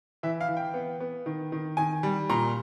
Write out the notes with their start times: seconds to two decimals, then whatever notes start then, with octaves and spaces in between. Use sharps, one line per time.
0.23 E3 E5
0.41 F5
0.48 E3
0.57 G5
0.74 B3
1.00 B3
1.26 D#3
1.52 D#3
1.77 D#3 G#5
2.03 G3
2.30 A#2 A#5